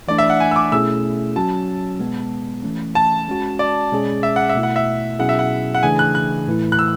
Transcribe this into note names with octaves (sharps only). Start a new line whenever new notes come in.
E3 A3 D4 D5
E5
F#5
G#5
E6
D6
B2 A3 C#4 E4 G#4 E6
F#3 C#4 F#4 A5
B2 G#3 B3
E3 A3 C#4
A5
G#3 C#4 F#4
D5
B2 G#3 C#4 G#4
E5
F#5
E5
B2 A3 E4
F#5
E5
B2 F#3 C#4 E4 G#4 F#5
E5
F#5
F#5
C#3 E3 A3 D4 G#4 G#5
F#6
F#6
A2 E3 A3 E4
F#6
E6